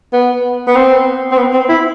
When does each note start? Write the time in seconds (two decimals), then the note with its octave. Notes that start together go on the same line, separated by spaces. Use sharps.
0.13 B3
0.67 B3
0.75 C4
1.32 C4
1.37 B3
1.53 C4
1.69 E4